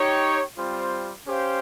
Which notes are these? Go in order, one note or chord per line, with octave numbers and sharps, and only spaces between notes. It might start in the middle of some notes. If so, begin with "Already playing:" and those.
Already playing: D#4 G4 C#5 G5
G3 C4 F4 C5
C#4 G4 C5 F5